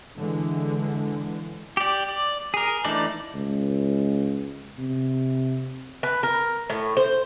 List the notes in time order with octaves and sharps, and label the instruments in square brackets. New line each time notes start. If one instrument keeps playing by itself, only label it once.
[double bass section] D3 E3 G#3
[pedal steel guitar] G4 D5
D5
G#4 A#4
E3 A3 D4 D#4 D5
[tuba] C#2
C3
[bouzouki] B4
A#4
A2
C5